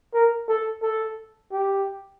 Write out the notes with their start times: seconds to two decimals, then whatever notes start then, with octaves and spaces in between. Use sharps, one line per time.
0.14 A#4
0.48 A4
0.83 A4
1.52 G4